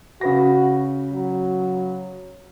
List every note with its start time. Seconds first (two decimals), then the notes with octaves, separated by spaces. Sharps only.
0.21 C#3 F#4 B4 A#6
1.13 F#3